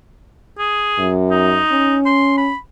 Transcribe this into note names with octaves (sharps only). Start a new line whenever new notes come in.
G#4
F#2
D#4
C#4
C6
B5